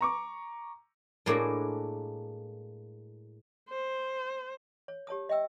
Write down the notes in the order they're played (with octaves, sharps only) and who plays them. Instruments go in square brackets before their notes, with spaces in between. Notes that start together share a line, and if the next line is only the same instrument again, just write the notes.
[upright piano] A#5 C#6 D6
[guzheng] A2 G#3 A#3 D4 E4 F#4
[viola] C5
[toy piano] C#5
G4 C#5 A5 D#6
D#5 E5 G5 E6